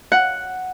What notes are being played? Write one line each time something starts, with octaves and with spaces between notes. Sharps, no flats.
F#5